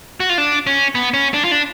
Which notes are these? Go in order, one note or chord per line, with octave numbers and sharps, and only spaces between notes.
F#4
F4
D4
C#4
B3
C#4
D4
F4
D4